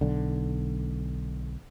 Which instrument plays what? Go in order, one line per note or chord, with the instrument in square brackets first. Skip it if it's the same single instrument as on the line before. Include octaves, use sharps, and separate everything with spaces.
[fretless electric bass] B1 D3